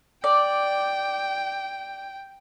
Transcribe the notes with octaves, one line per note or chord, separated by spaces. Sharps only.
D5 G5